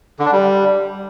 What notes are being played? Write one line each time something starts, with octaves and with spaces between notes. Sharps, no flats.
D3
D4
G3